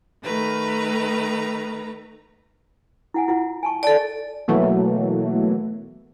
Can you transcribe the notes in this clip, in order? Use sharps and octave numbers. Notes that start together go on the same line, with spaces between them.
D#3 A3 B4 A#5
E4 F#5 G#5
E4 F4 F#5
G#5 A5 C#6
A4 C#5 D5 A5
B2 E3 F#3 A3 A#3